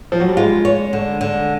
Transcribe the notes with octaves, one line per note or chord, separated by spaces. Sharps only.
F3
F#3
G3
G#3 F4
C#5
D3
D3